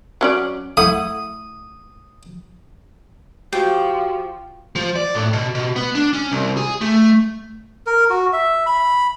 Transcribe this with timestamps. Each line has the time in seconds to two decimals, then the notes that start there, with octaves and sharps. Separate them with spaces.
0.21 F#3 C#4 D5
0.77 A3 E4 F#5 D#6
3.53 F3 F#4 G4 G5
4.76 F3
4.96 D5
5.15 A2
5.33 B2
5.55 B2
5.76 B3
5.95 D4
6.13 C#4
6.32 C2
6.57 G#4
6.81 A3
7.86 A#4
8.10 F#4
8.33 E5
8.66 B5